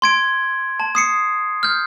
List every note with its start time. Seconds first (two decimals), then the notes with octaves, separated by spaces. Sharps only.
0.02 C6 G#6 D7
0.80 A5
0.95 D#6 C7 C#7
1.63 F6 G6